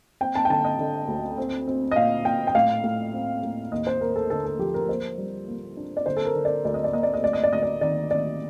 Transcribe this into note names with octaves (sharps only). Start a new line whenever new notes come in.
C4 G5
A5
G5
D3 A5
D#5
D3
D2
C4
C4
D#5
A#2 F5
A#2 G5
G5
A2 F5
A2
C4
A2
D#2 D#5
C5
D#2 A#4
A4
D3 A4
A4
F3 G4
A#4
A#3 C5
G3
A#3
D4
D5
D3 C5
A4
A#4
D3
D5
D2 D5
D#5
D5
A#3 D#5
D5
D#5
D2 D5
D#5
D5
D2 D#5
D5
D#3 D5
D#3 D5